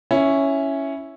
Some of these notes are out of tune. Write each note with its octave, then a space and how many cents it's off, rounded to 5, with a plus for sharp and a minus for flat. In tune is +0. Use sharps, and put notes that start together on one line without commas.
C#4 +0 E4 +0